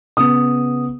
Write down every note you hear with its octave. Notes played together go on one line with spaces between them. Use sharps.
C#3 B3 D#6